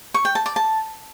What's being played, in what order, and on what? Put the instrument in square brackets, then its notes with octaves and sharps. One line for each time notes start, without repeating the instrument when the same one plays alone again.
[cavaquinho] C#6
G5
A5
D5
A5